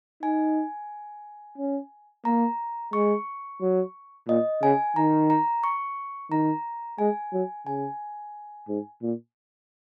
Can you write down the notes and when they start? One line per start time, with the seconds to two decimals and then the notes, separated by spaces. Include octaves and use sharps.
0.23 D#4 G#5
1.58 C#4
2.25 A#3 A#5
2.93 G#3 C#6
3.61 F#3
4.28 A#2 D#5
4.62 C#3 G#5
4.96 D#3 A#5
5.30 A#5
5.64 C#6
6.31 D#3 A#5
6.98 G#3 G#5
7.33 F#3
7.67 C#3 G#5
8.68 G#2
9.02 A#2